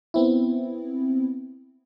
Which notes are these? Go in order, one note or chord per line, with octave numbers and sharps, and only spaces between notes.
B3 C4 E4